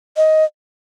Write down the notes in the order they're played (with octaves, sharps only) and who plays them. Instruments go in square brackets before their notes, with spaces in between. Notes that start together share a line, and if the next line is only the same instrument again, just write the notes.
[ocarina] D#5